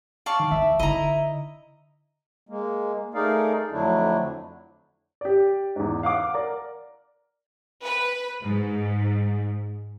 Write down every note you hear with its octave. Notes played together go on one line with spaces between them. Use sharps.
D5 F5 A5 C#6
D#3
E3 E5
D3 D#4 E4 D#5 A#5
G#3 A#3
A3 D#4 G#4 A#4 D5 F5
F2 D3 F#3 A3 D4 E4
G4 D5
E2 G#2
F5 F#5 D6
A#4 D5
B4
G#2